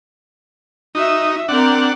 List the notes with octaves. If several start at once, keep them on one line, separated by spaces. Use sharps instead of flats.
D#4 F#4 E5
C4 D4 A#4 F#5